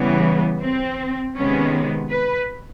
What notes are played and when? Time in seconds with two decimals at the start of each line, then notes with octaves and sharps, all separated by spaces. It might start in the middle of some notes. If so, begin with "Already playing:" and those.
Already playing: C#3 E3 G3 B3
0.63 C4
1.36 C3 D#3 G#3 B3 C#4
2.10 B4